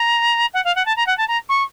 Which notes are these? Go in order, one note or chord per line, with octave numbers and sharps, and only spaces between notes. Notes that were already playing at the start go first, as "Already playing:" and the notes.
Already playing: A#5
F#5
F5
F#5
A5
A#5
F#5
A5
A#5
C#6